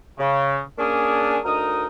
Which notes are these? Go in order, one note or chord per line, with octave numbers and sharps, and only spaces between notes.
C#3
A#3 C#4 D4 G#4
D2 D#4 A#4 D#6